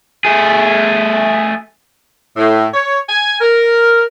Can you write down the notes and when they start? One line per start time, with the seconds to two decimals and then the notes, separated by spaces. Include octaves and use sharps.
0.25 A3 G#4
2.37 A2
2.74 C#5
3.09 G#5
3.40 A#4